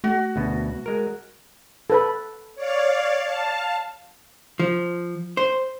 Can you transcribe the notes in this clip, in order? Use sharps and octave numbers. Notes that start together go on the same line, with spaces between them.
A3 F#4
D2 B2
G#3 A#4
A4 B4 B5
C#5 D5 F5
F5 A5
F3
C5